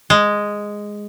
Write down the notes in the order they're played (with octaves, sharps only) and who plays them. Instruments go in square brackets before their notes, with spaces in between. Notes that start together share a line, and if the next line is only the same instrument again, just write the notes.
[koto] G#3